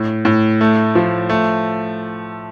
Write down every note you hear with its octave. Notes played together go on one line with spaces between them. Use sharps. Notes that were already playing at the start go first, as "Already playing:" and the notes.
Already playing: A2
A2
A3
F3
A3